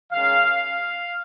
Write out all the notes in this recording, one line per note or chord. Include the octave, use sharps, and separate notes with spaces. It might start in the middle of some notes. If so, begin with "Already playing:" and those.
D#3 G#3 C#4 F5
F5